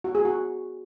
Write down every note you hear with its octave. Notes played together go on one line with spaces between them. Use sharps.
F#4
G#4
F#4